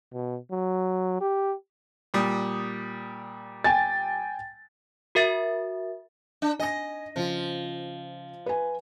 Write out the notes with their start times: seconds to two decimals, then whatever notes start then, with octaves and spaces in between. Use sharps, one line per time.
0.13 B2
0.51 F#3
1.21 G4
2.14 A#2 G3 D#6
3.64 G5 G#5 A6
5.15 F#4 A#4 E5 A6
6.42 D4
6.60 D#5 G#5 A#6
7.16 C#3 F3 F4
8.46 B4 G#5